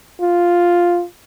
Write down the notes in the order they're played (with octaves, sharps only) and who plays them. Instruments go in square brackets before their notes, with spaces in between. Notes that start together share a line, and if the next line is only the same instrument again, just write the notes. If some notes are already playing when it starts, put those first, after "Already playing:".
[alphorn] F4